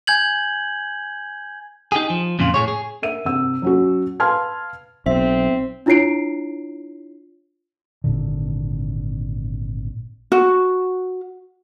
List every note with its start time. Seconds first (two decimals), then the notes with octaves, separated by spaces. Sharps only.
0.07 G#5 G6 G#6 F#7
1.92 D#4 G4 G#4
2.10 F3
2.39 F2 A#2 C#3 F4
2.54 A2 G#4 C#5
2.68 G#4
3.02 A#4 E5 D#7
3.25 C3 E6
3.62 F#3 C#4 F#4
4.20 B4 F5 A5 C6 F6 G#6
5.06 B1 C4 E5
5.86 D4 E4 F4 C#5 C7 D7
8.04 G#1 A#2 D3
10.32 F#4